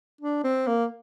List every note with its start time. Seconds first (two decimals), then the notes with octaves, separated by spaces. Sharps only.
0.21 D4
0.44 C4
0.67 A#3